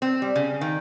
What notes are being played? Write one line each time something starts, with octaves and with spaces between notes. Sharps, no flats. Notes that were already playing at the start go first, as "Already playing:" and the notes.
C4
G3
C#3
D#3